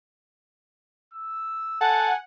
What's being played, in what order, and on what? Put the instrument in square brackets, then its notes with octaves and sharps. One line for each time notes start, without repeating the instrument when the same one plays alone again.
[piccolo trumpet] E6
[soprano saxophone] A4 [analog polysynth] F#5 [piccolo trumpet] G#5